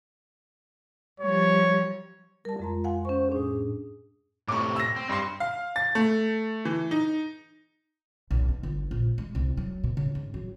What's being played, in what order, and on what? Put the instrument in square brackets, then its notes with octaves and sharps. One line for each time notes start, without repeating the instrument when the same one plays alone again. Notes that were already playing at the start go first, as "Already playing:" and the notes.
[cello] F3 G3 [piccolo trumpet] C#5
[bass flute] G3 [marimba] A#4 A5
[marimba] F2 G#3 A#5 [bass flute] F4
[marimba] F5 F#5 G#5
[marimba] C#4 C#6 [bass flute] C5
[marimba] A2 D4 [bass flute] G#4
[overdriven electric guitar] A2 C3 [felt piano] C#6 D6
[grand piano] E6 A#6
[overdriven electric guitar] C4
[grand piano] G2 C6 [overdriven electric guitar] C4
[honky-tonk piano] F5
A6
A3
E3
D#4
[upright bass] B1
D#4
G1
A#1
G#3
C2
F#3
B2
C#3
G#2
F#3